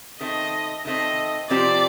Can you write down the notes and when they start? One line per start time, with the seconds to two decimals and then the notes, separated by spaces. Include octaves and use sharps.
0.20 D#3 A3 C4 D#5
0.85 D#3 A3 C4 D#5
1.50 C3 F3 C4 G4 C5 D5